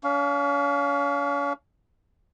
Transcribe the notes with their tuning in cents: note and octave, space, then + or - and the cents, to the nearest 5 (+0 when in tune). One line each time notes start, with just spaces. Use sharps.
C#4 +40 F5 +0